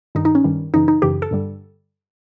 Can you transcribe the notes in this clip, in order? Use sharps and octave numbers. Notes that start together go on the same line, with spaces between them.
G2 D#3 G3 D#4
D#4
C#4
G2 D#3 G3
F#2 C#3 E3 D#4
D#4
F#2 C#3 E3 G4
A4
G2 D3 G3